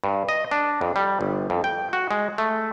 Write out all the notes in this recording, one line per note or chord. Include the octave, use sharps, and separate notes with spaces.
G2
D#5
D4
F2
G3
G1
F2
G5
F#4
G#3
A3